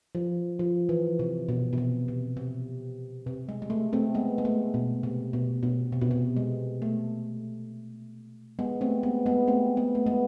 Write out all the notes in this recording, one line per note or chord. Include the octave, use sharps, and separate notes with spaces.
F3
F3
E3
C3
B2
B2
C3
C3
C3
C3
G#3
G#3
A3
A3 C4
G#3 B3
G#3
A3
B2
C3
B2
B2
C3
B2
C3
G#3
A3
G#3 B3
A3 C4
G#3 B3
G#3 B3
A3 C4
G#3 B3
A3
G#3 B3